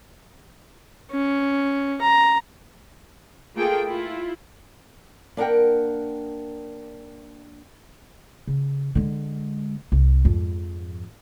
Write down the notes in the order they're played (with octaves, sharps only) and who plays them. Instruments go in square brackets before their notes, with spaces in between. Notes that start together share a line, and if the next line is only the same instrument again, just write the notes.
[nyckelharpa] C#4
A#5
[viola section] A3 A#3 F4 G#4 A4 G5
E4 F4
[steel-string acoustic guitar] A#3 D4 A#4 F#5 G5
[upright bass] C#3
D3 G#3
C2
F2 G#2